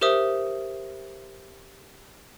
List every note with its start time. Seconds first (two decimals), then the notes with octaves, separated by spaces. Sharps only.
0.01 G4 A#4 C5 E5 D#6